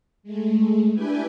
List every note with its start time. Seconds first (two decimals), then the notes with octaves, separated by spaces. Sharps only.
0.23 G#3 A3
0.93 D4 E4 G4 B4 G5 G#5